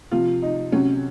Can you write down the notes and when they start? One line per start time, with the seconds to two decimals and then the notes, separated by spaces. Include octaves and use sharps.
0.11 C3 F3 F4
0.42 D#4
0.72 C3 F#3 C#4